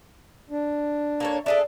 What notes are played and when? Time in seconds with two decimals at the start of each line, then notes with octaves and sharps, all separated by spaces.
0.50 D4
1.20 A#3 A4 C#5
1.46 D4 G#4 A4 D5 E5